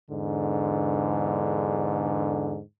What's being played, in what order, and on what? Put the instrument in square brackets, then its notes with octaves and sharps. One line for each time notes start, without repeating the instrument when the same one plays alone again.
[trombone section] E2 G#2 D3